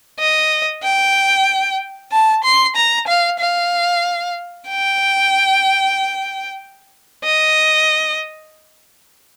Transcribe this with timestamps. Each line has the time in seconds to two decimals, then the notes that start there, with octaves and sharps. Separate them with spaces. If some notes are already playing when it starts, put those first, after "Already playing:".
0.19 D#5
0.83 G5
2.12 A5
2.44 C6
2.76 A#5
3.07 F5
3.40 F5
4.68 G5
7.24 D#5